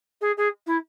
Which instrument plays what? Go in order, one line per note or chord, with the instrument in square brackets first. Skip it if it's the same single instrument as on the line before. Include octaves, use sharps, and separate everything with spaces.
[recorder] G#4
G#4
E4